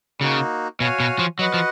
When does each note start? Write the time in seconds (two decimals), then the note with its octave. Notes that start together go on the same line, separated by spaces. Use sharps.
0.21 C#3 A#3 D#4 F#4
0.80 B2 F#4 C#5 F5 G#5
1.00 B2
1.19 F3
1.38 F#3 F#4 B4 D#5 F#5
1.54 F3